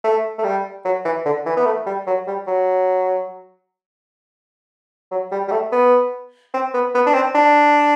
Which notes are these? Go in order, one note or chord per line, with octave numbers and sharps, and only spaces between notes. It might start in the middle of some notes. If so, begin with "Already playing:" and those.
A3
A3
G3
F#3
E3
D3
E3
B3
A3
G3
F#3
G3
F#3
F#3
G3
G3
A3
B3
C4
B3
B3
D4
C4
D4